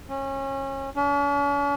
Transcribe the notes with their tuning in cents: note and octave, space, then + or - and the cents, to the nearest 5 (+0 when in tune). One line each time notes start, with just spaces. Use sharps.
C#4 -30
C#4 +45